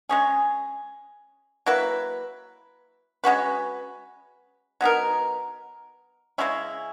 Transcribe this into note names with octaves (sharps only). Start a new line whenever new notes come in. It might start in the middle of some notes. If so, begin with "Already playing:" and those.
G#3 C#4 G#4
F#3 A#3 E4 B4
G#3 C#4 F#4 B4
F#3 B3 D#4 A#4
C#3 G#3 C#4 E4